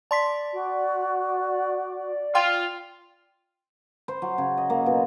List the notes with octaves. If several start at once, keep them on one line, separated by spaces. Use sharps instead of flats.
D5 A5 C6 B6
F#4
F4 G5 C6
C5
F#3
C#3
D#5
A#3
B2